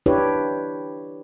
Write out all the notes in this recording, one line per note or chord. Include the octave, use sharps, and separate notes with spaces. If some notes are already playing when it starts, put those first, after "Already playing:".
D4 E4 G4 B4 C#5